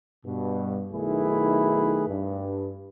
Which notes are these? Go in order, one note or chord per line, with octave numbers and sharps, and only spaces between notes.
G2 B2
B1 D#3 A3 E4 G#4 B4
G2